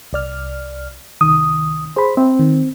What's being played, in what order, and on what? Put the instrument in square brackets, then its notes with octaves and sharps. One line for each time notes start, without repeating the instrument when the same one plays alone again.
[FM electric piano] C2 D5 F6
[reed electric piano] C2 D#6 [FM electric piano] D#3
[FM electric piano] G#4 [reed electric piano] C5 B5
[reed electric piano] C4 [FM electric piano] E5
[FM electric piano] D#3